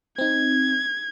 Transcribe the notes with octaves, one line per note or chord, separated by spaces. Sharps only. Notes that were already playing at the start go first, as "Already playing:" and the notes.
C4 D#4 G#6